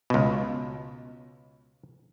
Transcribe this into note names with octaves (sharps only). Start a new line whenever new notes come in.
C#2 B2